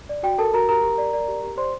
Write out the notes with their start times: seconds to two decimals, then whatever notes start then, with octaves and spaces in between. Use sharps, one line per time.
0.09 D5
0.23 F#4 G5
0.38 A4 A#4 A5
0.54 F#4 A#4 A#5
0.69 G4 A#4 A#5
0.83 G4
0.98 D5
1.13 D5
1.28 G4
1.43 G4
1.57 C5 D5 C6